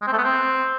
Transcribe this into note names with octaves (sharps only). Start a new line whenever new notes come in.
G#3
C4
A3
B3
C4